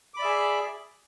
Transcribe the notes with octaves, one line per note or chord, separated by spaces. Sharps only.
G#4 D5 E5 B5 D6